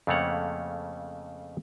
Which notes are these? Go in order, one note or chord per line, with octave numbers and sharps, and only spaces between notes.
F2 C#3 A3 A#3 C#5 F#5